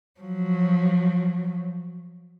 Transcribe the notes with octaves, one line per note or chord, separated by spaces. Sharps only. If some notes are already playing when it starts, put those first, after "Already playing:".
F3 F#3